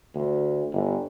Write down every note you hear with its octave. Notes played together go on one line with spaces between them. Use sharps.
D2
G1